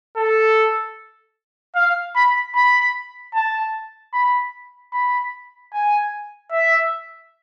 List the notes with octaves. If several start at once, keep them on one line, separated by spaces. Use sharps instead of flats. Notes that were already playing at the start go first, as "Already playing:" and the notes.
A4
F5
B5
B5
A5
B5
B5
G#5
E5